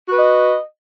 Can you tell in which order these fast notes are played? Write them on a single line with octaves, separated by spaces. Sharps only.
F#4 B4 D#5